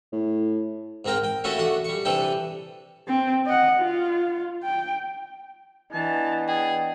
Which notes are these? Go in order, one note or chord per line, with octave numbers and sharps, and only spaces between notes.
A2
G#2 C4 A#4 G5
G5
A3 C#4 E4 F#4 A4
A3 D4 F#4
G3 C#6
C3 E3 D4 A4 G5
C4
D#5 F#5
F4
G5
E3 B3 D4 D#5 A5
G#4 G5